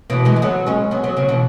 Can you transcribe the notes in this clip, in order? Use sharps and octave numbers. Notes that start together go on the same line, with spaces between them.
B2 E3
E3 G#3
G#3
F#3 B3
G#3 C#4
F#3 B3
F#3 B3
C#3 F#3
B2 E3